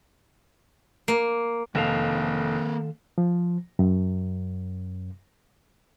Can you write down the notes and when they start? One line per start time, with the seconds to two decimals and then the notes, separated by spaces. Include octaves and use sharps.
1.08 A#3
1.75 F1 D#3 A#3 C4 A4 F5
3.18 F3
3.79 F#2